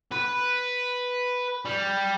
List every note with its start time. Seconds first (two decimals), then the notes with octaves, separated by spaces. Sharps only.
0.12 B4
1.65 G3